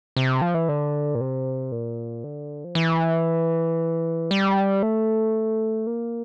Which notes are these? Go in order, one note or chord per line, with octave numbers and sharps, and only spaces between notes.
C3
F3
E3
D3
A#2
C3
A#2
D3
F3
E3
G3
A3
A#3